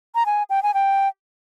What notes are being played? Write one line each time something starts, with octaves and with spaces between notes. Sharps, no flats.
A#5
G#5
G5
G#5
G5